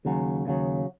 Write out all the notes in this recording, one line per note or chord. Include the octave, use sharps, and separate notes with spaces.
D#2 C#3 F#3
D#2 C#3 F#3